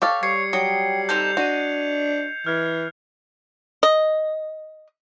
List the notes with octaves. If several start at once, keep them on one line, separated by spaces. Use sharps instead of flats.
G4 A4 C#5 F5
G3 C#5 G#6 C7 C#7
F#3 G5 D#6 C#7
C4 D#4 A4 G6 F7
D4 F#4 D#5
E3 F6 F#6 G#6
D#5